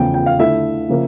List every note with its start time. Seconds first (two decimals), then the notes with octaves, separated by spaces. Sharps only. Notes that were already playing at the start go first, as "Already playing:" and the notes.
Already playing: E2 C#3 F3 A3 G5
0.14 G5
0.26 F5
0.39 D3 A3 E4 E5
0.89 C#3 F3 A#3